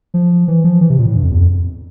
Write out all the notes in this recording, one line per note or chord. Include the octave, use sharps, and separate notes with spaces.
F3
E3
F3
E3
C3
A#2
A2
G2
F2
E2
F2